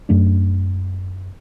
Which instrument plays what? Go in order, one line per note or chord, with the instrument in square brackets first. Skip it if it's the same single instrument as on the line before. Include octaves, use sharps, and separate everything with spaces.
[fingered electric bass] F#2 A3 D4